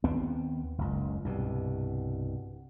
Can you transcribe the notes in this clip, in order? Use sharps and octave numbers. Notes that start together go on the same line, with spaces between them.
D#2 B3 C4
F#1 C#2
C2 G2 B2